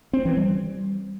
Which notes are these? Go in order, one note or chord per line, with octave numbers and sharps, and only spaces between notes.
C4
E3
G3